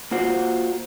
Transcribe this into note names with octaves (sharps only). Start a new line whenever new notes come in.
A#3 F4 F#4 C5